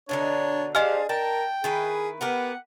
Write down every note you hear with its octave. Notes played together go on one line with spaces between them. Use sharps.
B2 D3 D4 D#4 C#5
D4 G4 G#4 C5 D#5 F5 G#5 F6
A#4 G5 A5
D#3 E4 G#4 B4
B3 G4 A#4 B4 F#5